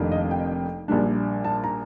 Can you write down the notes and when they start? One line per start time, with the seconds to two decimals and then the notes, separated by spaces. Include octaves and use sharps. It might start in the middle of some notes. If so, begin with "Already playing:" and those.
Already playing: F1 F2 D#3 A#3 D4
0.12 D#5
0.31 G5
0.88 A#1 A#2 G3 D4
1.44 A5
1.64 A#5